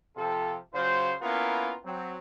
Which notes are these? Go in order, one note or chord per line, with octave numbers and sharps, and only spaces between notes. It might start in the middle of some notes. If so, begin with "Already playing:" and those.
C3 F3 F4 G4 A4
C#3 F#3 F4 C5
A#3 B3 C#4 E4 F4 A#4
F#3 C4